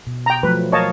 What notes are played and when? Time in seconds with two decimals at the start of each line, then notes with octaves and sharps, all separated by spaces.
0.07 B2
0.26 G5 A#5
0.43 F3 F#3 A3 B4
0.72 A#4 C#5 D#5 F5 A5